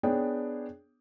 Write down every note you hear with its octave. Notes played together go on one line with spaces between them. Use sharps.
B3 D4 G#4 C#5 G5